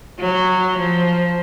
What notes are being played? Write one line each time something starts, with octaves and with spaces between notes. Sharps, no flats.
F#3
F3